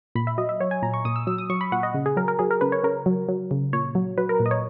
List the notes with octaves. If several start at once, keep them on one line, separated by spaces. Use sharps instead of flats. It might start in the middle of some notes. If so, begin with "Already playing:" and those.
A#2 B5
E5
F#3 D#5
E5
F#3 C#5
G#5
A#2 A#5
C#6
A#2 D#6
E6
F#3 E6
D#6
F#3 C#6
B5
A#2 F#5
D#5
C#3
G#4
F#3 A#4
A#4
F#3 G#4
A#4
C#3 B4
C#5
C#3 A#4
F#3
F#3
C#3
A#2 C#5
F#3
F#3 B4
A#4
A#2
D#5
C#5